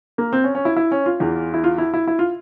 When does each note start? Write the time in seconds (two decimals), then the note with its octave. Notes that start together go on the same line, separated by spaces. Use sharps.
0.18 A#3
0.33 C4
0.44 C#4
0.55 C#4
0.65 E4
0.76 E4
0.91 C#4
1.06 F4
1.20 E2 E3
1.54 E4
1.64 F4
1.78 E4
1.94 E4
2.07 E4
2.19 F4